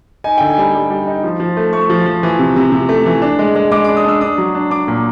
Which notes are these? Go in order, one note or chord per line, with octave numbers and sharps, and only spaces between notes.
D#4 G#5
D3 G5
G#5
G3
G3
G3
D#4
F3
F3
A3
A3 C#6
F3
F3
E3
C3
C3
C3
A3
E3
D4
G#3
G#3
G#3 D6
D6
D4
D#6
D4 E6
D4 D#6
F#3
D4
D4 D6
A#2